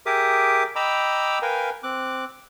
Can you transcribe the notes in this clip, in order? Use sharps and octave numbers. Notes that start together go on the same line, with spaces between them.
G4 G#4 A#4 E5 D6 D#6
D#5 G5 A#5 B5 D6 E6
A#4 B4 F5 G5 G#5
C4 D6 F#6